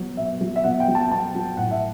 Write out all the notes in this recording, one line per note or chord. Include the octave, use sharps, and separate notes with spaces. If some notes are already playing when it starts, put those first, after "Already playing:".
Already playing: B2 F#3
B2 E5
F#3
E5
B2 F#5
G5
F#3
A5
B2 A5
F#3
A2 F#5
E5